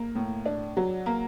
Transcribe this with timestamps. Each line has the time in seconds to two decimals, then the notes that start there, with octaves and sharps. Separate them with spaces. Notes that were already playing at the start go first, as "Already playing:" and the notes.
Already playing: A#3
0.15 A2
0.46 D4
0.77 F#3
1.06 A#3